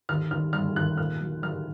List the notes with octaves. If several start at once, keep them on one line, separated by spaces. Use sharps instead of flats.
D#2 F6
D#2 F6
G3 F6
D#2 F#6
A#2 F6
F#3
F#3 F6